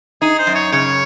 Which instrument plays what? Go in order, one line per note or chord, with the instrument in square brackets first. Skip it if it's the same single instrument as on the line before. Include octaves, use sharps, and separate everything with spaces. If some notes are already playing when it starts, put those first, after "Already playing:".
[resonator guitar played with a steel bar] D#4 [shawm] G#4
[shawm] C5
[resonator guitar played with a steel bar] F#2
[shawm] C#5
[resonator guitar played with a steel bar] C#3 [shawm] C#5